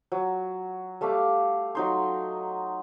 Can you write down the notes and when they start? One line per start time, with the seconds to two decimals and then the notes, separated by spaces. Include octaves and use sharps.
0.12 F#3
1.01 G3 A3 F5 D6
1.75 F#3 D#4 C6